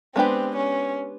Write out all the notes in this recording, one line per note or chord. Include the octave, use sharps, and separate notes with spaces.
G#3 B3 C4 D4 G4 B4
C#4